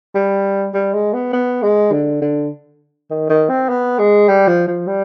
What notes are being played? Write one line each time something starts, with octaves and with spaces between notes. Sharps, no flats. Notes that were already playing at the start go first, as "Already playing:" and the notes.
G3
G3
G#3
B3
B3
G#3
D3
D3
D#3
D#3
C4
B3
G#3
G3
F3
F3
G3